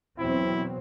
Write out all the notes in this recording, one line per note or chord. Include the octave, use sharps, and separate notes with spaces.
E2 B2 F#3 C4 E4